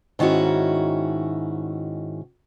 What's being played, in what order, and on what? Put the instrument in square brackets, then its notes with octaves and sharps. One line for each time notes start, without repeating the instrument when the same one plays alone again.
[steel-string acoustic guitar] G#2 D#3 C#4 E4 F#4